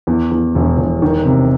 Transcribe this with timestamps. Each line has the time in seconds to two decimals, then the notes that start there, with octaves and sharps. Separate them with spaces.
0.07 E2
0.31 E2
0.55 E1
0.78 E1
1.02 D#3
1.26 C3